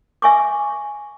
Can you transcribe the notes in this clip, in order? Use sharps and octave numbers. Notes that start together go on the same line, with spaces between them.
E5 G#5 C#6 D6